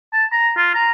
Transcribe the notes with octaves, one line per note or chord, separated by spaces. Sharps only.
A5
A#5
F4
A#5